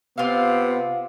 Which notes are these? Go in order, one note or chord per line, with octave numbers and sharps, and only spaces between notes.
C3 B3 F4 F5